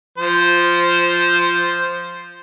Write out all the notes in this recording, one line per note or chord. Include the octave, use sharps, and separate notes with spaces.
F3 C5